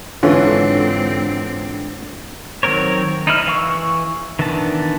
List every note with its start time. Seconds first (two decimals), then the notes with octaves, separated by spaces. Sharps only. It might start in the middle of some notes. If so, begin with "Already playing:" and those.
0.23 G#2 D3 E3 C4 C#4 F4
2.63 D#3 F#3 C4 A#4 C#5
3.27 D#4 E4 F6
3.47 E3 F5 C#6 E6
4.39 D#3 E3 B3 D4 A5